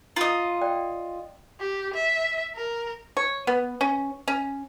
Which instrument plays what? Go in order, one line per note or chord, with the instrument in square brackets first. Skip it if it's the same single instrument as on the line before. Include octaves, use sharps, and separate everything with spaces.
[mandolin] F4 D#5 [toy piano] A#5
[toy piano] D5 G5
[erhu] G4
E5
A#4
[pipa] C#5
B3
C#4
C#4